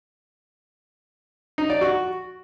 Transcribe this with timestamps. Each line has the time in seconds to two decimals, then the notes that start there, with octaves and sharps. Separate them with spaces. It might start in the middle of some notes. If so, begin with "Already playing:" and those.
1.58 D#4
1.70 D5
1.81 F#4